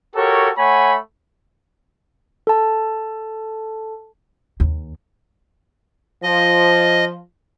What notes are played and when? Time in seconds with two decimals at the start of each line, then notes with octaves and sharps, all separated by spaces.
0.16 F#4 G4 A4 A#4 C#5
0.58 A3 C#5 F#5 G#5 B5
2.47 A4 A5
4.60 D#2
6.23 F3 D#5